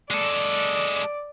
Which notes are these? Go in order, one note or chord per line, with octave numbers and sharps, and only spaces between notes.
G#3 A4 D5